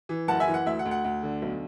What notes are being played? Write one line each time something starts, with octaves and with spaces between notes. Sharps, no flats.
E3
F#1 F#5 A5
E5 G#5
E3
F#5
D2 E5
F#5
D2
F#5
D2
D3
B1